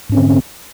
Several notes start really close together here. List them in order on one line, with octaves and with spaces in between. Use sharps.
G#2 C#4 C4 D3